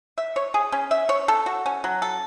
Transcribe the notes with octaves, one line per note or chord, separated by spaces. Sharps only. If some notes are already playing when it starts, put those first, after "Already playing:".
E5
C#5
G#4
C#4
E5
C#5
A4
F#4
C#4
F#3
A4